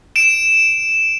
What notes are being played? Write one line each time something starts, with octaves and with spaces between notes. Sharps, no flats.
D7 E7